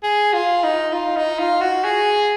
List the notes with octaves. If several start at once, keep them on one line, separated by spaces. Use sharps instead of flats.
G#4
F4
D#4
F4
D#4
F4
F#4
G#4